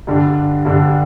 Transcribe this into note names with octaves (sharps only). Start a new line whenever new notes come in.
G2 D3 G3 D4
G2 D3 G3 D4